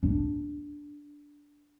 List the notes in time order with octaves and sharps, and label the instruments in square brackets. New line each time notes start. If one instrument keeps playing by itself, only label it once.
[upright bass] D4